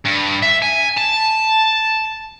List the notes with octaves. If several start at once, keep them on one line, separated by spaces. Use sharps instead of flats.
G2
E5
G#5
A5